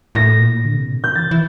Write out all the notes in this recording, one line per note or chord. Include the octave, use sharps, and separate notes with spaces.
A2 A#6
A#2
D3
C3
A#2
C3
G6
E3 A6
E3